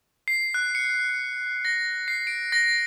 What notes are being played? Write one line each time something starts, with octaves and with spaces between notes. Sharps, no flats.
C7
F#6
C#7
A#6
C7
D7
A#6